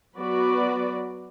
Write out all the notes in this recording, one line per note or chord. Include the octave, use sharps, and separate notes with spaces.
F#3 B3 F#4 B4 D5